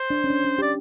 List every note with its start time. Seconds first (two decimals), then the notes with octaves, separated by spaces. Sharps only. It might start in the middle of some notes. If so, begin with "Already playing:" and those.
Already playing: C5
0.10 D4
0.24 C#4
0.30 D4
0.44 C#4
0.59 G4 D5